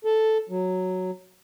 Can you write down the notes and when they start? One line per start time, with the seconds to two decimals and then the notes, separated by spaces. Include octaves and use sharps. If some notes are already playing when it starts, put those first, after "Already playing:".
0.05 A4
0.49 F#3